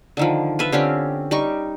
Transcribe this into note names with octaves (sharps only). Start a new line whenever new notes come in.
D3 D#3 F3
F4 B4 E5
D3 C4 C#4 G4
G3 D#4 C#6